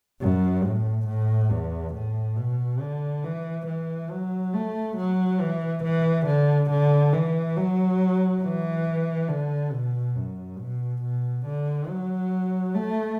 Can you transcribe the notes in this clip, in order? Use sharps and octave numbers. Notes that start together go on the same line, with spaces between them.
F#2
A2
A2
E2
A2
B2
D3
E3
E3
F#3
A3
F#3
E3
E3
D3
D3
E3
F#3
E3
D3
B2
F#2
B2
B2
D3
F#3
A3